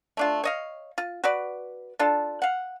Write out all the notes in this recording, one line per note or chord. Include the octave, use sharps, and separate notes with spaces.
A3 D4 F4
C#5 D#5 F5
F4
F#4 B4 D5
D4 F4 A4
F5 F#5